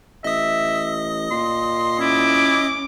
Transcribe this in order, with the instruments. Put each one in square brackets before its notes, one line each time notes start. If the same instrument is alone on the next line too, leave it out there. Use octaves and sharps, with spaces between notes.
[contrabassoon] A1 [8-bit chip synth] D#5 D#6 [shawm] E5
[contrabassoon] A#2 [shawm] C6
[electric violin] C#4 D6 [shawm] E4